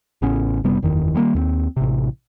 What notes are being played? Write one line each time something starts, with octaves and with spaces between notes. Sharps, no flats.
A1 C#3 B3 C#4
F#1 C3 G3 B3
F#1 E2 D#3
D#3 G3 G#3 A#3
D#2 A3 C4
A1 C3